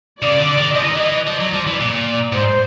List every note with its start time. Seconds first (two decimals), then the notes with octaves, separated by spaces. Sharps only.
0.22 C#3 D5
0.40 D3
0.58 D#3
0.75 F3 D#5
0.83 E3
0.89 D#3
0.97 E3
1.27 F3 D5
1.40 F#3
1.53 F3
1.67 E3
1.80 A#2
2.32 G#2 C5